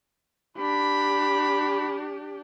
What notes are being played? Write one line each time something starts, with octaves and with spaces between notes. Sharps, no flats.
D4 G4 B5